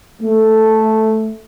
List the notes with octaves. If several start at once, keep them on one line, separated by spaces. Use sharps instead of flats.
A3